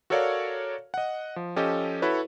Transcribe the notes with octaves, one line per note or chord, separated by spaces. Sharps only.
F#4 A4 A#4 C#5 D5 F5
D#5 F#5
F3
F3 C#4 G4 A4 D#5
E4 F#4 A4 B4 C#5